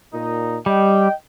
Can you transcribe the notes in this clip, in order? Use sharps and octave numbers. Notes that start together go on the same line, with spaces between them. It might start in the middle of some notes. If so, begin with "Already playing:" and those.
A#2 D#4
G3 D#5 G5